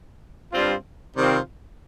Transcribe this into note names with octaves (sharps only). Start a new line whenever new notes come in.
G2 G3 C4 F4
C3 D#3 G3 C4 F4